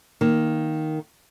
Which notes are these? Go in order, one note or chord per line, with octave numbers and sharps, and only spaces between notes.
D#3 A#3